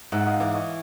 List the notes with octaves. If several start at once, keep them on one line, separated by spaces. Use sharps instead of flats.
G#2 E5 F#5
D#5 F5
E3 D5 E5
C#5 D#5